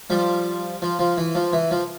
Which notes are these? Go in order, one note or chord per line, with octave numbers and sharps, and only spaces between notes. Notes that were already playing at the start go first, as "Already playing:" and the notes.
F3 G3
F3
F3
E3
F3
E3
F3